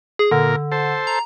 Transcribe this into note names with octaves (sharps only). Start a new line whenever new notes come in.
G#4
A#2 D3 A#4
A4 C5
A#5